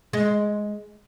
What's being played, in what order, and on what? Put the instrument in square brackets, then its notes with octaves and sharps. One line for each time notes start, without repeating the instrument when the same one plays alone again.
[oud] G#3